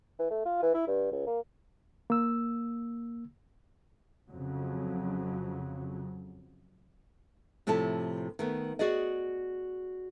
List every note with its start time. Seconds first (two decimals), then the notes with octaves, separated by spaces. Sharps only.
0.19 E3
0.31 A3
0.45 F4
0.62 E3
0.74 E4
0.87 G2
1.12 C#2
1.27 A#3
2.10 A#3 E6
4.31 F2 C#3 F#3
7.67 A2 C3 F3 E4 A4
8.39 D#3 A3 B3
8.79 F#4 G#4 D5 D#5